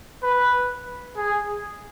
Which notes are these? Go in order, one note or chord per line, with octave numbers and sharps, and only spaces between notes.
B4
G#4